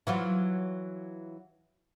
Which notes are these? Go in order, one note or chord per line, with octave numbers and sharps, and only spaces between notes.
E3 F#3 F4